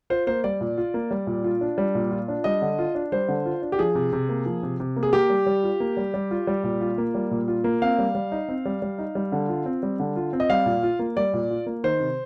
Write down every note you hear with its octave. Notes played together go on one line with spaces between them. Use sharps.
F4 C5
A#3 C5
G3 D5
A#2
F4
A#3
G3
A#2
F4
D4
G3
A#2
F4
D4
G3 D#5
D3
F4
D4
G3 C5
D3
F4
D4
G4
F3 G#4
C3
C3
A#3
F3
C3
C3
A#3
G#4
A#3 G4
G3
G3
F4
A#3
G3
G3
F4
G3
A#2
F4
A#3
G3
A#2
F4
A#3
C4 F5
G3
G3
D#4
C4
G3
G3
D#4
G3
D3
F4
C4
G3
D3
F4
C4
D#5
G3 F5
A#2
F4
A#3
G3 D5
A#2
F4
A#3
D#3 C5
C3